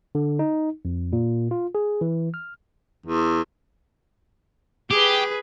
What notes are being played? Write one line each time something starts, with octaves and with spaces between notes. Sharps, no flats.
D3
D#4
F2
A#2
F4
G#4
E3
F6
E2
G4 G#4 B4